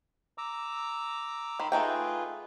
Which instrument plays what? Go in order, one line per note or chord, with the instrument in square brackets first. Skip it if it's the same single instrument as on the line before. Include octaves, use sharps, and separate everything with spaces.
[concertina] A#5 D6 E6
[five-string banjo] D#3 [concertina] B5 C6
[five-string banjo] A3 D#4 G5 [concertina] F4 G#4 B4